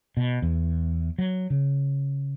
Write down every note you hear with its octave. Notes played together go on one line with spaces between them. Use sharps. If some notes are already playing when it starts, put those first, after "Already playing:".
B2
E2
F#3
C#3